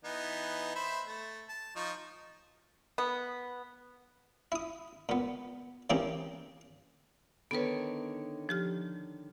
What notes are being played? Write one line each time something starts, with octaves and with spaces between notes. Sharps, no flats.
E3 B3 D#4
C5 E5 B5
A3
A5
F3 D#4 C#6
B3
E4 D#6
A#2 B3
E3 A#3 C4 C#4 G4 G#4
D3 D#3 B3 B4 C#5
F3 G4 F6